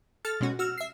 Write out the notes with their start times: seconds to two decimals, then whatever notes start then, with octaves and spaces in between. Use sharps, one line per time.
0.25 A4 F6 A6
0.40 B2 G#3 C#4 F#4
0.59 F#4 E6 F6
0.77 E5 C7